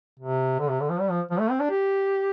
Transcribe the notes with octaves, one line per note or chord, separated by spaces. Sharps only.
C3
D3
C3
D3
F3
G3
F3
F3
A3
C4
D4
G4